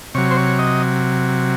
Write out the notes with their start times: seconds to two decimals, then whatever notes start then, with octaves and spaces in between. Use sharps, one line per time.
0.15 C3 F#3 C#5
0.31 C5
0.37 C#5
0.59 D#5